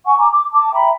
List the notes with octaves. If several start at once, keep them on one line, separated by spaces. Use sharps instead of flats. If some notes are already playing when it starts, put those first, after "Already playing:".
F#5 G#5 C#6
G#5 A#5 D6
D6
A5 D6
E5 G5 A#5 B5